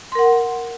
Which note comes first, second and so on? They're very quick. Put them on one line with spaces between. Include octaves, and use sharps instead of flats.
C6 A#4 F#5